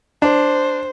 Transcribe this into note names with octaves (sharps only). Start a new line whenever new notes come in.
D4 C5